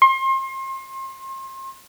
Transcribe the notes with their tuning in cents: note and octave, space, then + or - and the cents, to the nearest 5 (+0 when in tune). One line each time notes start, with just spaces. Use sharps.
C6 +35